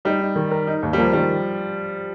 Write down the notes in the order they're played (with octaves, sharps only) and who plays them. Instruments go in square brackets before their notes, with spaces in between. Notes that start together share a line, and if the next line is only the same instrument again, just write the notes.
[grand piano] G3 [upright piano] D#4
[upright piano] D#4
D#3
A#4
D#4
D#2
[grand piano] G3
[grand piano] F3 [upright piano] A#3
[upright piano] D#3 [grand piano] G3